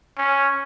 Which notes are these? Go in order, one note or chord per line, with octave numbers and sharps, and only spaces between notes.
C#4